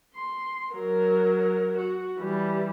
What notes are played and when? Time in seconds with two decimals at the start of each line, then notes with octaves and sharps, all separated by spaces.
0.15 C6
0.72 F#3 A#4
1.77 F#4
2.18 E3 G3